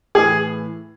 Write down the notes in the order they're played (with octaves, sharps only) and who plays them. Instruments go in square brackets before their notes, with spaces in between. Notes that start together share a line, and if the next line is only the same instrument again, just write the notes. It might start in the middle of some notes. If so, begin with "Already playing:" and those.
[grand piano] A2 E3 G#4